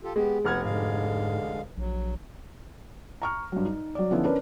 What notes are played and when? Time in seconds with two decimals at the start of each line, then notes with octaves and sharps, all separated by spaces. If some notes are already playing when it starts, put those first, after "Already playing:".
0.03 F4 G4 A4
0.16 G#3 B3 G4
0.45 F1 B3 F#5 F6 G#6
0.65 G#2 D3 G#3 F5
1.77 A#1 F#3
3.22 A#5 C#6 F6
3.52 G2 F#3
3.65 D#4
3.95 F#3 D5
4.11 D3 F3 B3 C#4 E4
4.24 C#4 D4 A#4 B4